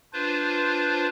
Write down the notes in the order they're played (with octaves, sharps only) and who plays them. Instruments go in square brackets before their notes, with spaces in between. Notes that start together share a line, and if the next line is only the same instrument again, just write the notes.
[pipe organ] D4 F4 B4 C5